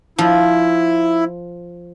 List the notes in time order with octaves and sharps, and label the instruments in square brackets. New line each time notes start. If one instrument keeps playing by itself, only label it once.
[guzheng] F3 [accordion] E4